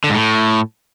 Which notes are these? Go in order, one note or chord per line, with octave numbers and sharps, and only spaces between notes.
D3
G#2
A2